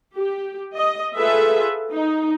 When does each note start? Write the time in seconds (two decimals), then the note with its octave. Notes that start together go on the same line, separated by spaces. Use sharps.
0.15 G4
0.76 D#5
1.15 F4 G#4 A4 B4 E5
1.89 D#4